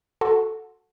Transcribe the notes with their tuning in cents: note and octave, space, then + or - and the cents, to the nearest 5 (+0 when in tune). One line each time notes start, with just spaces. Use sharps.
F#4 -10 A4 +0 C6 +0